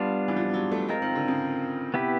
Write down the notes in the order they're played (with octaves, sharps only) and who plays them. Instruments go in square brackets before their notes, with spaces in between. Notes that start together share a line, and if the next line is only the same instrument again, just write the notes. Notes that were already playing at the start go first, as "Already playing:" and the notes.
Already playing: [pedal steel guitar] G3 B3 D4 F4
[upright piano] E3
F3
F#3
A3
[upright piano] G#3 [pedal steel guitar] C4 F4 A#4
[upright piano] D#3
D3
C#3
[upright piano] C3 [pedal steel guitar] B3 E4 G4 B4